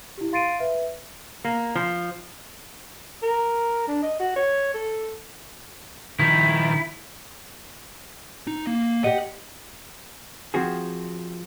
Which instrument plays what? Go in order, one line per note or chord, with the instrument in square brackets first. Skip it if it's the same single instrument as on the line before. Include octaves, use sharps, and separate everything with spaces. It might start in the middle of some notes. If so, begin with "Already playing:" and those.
[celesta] E4 G4
F5 C6 A6 C7 D7 D#7
B4 E5
[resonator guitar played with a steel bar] A#3
F3
[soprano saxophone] A#4
D4
D#5
F#4
C#5
A4
[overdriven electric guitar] D#3 F3 [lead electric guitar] E4
[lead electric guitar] D#4
A#3
[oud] G4 D#5 [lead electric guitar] F#5
[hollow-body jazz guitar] F3 C4 F#4 G#4